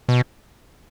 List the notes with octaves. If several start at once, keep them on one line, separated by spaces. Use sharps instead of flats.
B2